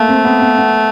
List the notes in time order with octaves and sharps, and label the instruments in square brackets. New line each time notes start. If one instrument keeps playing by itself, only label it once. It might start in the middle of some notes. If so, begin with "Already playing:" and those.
Already playing: [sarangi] A3 [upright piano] A#3
[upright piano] C4
B3
B3
B3